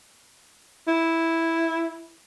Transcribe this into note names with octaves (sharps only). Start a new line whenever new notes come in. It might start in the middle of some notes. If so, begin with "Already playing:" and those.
E4